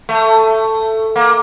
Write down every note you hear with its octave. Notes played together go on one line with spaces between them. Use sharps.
A3
A#3